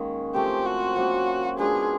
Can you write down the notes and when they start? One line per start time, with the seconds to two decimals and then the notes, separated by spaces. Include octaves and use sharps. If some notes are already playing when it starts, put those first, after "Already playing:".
Already playing: D#3 G#3 A#3 C#4
0.34 F3 A3 C4 G4
0.66 F#4
0.96 F#3 A#3 C#4
1.58 G#3 B3 D4 F4 G#4